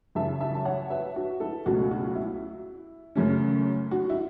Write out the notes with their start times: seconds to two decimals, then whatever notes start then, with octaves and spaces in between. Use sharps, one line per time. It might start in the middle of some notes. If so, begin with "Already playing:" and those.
0.15 F#2 C#3 E3 E5 A5
0.41 E5 A5
0.55 A5
0.65 C#5 F#5
0.90 B4 E5
1.16 F#4
1.40 E4 A4
1.66 C#2 B2 F#3 A3 F#4
1.91 F#4
2.15 E4
3.16 F#2 C#3 A3 C#4
3.91 F#4
4.10 E4